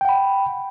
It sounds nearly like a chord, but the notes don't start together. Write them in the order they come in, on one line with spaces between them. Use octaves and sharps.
G5 F#5 B5